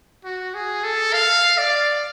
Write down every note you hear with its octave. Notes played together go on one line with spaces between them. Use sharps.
F#4
G#4
A4
F5
D5